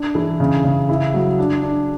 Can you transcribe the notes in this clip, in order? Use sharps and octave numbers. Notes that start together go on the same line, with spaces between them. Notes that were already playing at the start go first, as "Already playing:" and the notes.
Already playing: D4
E3
C#3
C#3
E4
F#3
D4
D4